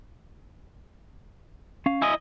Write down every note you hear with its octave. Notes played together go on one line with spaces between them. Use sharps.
C#4 F5
E4 D#5 G#5